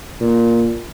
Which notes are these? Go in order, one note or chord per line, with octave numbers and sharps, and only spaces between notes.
A#2